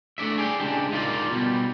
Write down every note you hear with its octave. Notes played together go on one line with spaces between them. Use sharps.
A3 D4 D5 E5
G#4 D5 F5 G5
C#3 G#3 D4 G4
D#4 F4 G4 A#4 D5
B2 G3